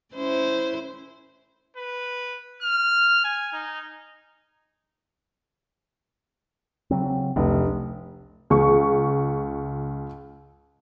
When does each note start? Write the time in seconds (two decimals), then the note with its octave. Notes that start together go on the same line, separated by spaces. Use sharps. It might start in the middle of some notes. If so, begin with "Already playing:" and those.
0.14 C#4 E4 C5
1.77 B4
2.62 F6
3.24 G#5
3.53 D#4
6.91 C#3 F#3 C4
7.36 F1 C2 D4
8.50 C#2 C#6